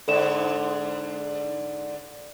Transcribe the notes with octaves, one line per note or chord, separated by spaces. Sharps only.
G#2 D3 A4 D5 E7